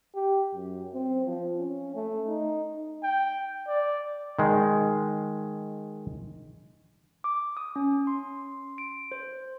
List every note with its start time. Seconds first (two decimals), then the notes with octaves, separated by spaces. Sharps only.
0.15 G4
0.54 F#2
0.94 C4
1.25 F3
1.56 C#4
1.95 A3
2.27 D#4
3.03 G5
3.67 D5
4.39 D#3 G#3
7.24 D6
7.57 D#6
7.76 C#4
8.07 C6
8.78 D7
9.12 C5